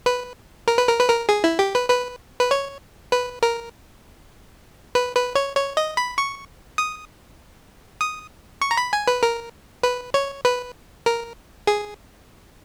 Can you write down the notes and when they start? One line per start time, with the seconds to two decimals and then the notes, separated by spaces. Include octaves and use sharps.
0.06 B4
0.68 A#4
0.78 B4
0.88 A#4
1.00 B4
1.09 A#4
1.29 G#4
1.44 E4
1.59 G4
1.75 B4
1.90 B4
2.40 B4
2.51 C#5
3.12 B4
3.43 A#4
4.95 B4
5.16 B4
5.35 C#5
5.56 C#5
5.77 D#5
5.97 B5
6.18 C#6
6.78 D#6
8.01 D#6
8.61 C#6
8.71 A#5
8.77 B5
8.93 G#5
9.08 B4
9.23 A#4
9.83 B4
10.14 C#5
10.45 B4
11.06 A#4
11.67 G#4